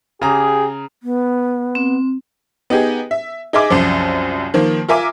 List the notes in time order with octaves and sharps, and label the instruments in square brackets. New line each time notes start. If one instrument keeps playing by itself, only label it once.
[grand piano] C#3 A#5 [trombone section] G4 G#4
[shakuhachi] B3
[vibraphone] C4
[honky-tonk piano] B3 D#4 G4 G#4
E5
D#4 G#4 E5 D6
C2 F#2 F3
D#3 F3 A#3
F4 A#4 E5 G#5 D6